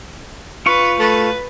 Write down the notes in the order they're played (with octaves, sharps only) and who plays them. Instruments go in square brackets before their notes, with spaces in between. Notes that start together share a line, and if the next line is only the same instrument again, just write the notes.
[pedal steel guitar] F4 C#6 [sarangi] B4
[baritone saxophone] A3 [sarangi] B4